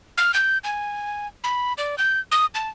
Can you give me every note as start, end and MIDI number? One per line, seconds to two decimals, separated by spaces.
0.18 0.32 89
0.34 0.58 91
0.64 1.27 80
1.44 1.73 83
1.78 1.95 74
1.98 2.20 91
2.32 2.46 87
2.55 2.69 81